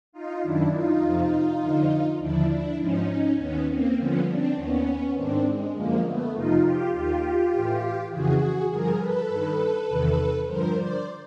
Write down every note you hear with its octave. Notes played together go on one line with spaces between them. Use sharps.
D#4 F4
F#2 D#3 D4 E4
D#4 F4
F2 C3 F3
F2 D3 F3
D#2 D3 F3 D4 E4
D4 E4
G#2 F3 C#4 D#4
D#2 D#3 B3 C#4
A#3 C4
G2 D3 F3 B3 C#4
C4 D4
D#2 D#3 B3 C#4
G#2 D#3 C4 D4
G#3
F#2 D3 F3 G#3 A#3
A3 B3
F2 C3 F3 D#4 F4
F4 G4
D#2 D#3 F4 G4
A2 E3
F2 C#3 E3 F#4 G#4
G2 D3 F3 G#4 A#4
A4 B4
G2 D#3
E2 C3 D#3
G2 D3 F3 A#4 C5
C5 D5